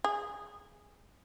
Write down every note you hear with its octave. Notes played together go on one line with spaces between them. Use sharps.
G#4